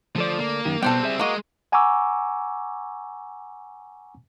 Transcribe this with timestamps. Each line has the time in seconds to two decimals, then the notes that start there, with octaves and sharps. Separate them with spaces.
0.16 D2 F3 A4 D5
0.38 A#3
0.65 F#2 D#3 G4
0.83 B2 G3 B3 C4 A4 C5 G5
1.03 G#4 E5
1.19 G#3 A#3 F#4 A#4 D#5
1.72 F#5 G#5 A#5 C#6 D6 E6